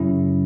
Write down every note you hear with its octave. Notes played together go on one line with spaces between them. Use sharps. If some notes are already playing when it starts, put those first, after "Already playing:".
Already playing: F#2 C#3 F#3 C#4 E4